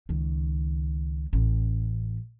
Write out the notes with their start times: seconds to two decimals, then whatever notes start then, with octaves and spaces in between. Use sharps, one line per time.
0.09 C#2 D#3
1.33 A1 C#4